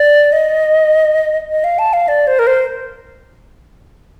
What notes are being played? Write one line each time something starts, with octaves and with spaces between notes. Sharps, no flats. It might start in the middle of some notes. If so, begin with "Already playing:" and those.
Already playing: D5
D#5
D#5
F5
A5
F5
D5
C5
A#4
C5